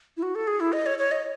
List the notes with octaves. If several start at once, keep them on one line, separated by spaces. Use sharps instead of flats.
E4
F#4
A4
G#4
E4
D#5
C#5
C#5
D#5